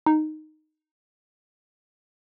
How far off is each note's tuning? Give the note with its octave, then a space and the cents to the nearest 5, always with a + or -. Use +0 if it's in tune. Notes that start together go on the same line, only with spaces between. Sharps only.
D#4 -5